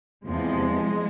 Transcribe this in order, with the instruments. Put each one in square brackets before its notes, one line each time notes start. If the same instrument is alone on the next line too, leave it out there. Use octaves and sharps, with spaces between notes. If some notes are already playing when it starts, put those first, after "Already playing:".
[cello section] E2 C3 F3 G#3